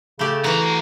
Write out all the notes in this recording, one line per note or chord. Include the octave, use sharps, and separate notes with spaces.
C#3 A3 G4 D5
E3 A3 F#4 A#5